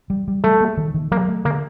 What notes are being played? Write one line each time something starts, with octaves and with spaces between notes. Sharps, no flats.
G3
G3
G3 A3
A#3
D#3
D#3
F#3 A#3
A3
D3 A#3